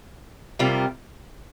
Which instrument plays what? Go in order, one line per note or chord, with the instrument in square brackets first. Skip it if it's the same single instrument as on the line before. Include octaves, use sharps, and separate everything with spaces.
[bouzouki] C3 G3 A#3 F4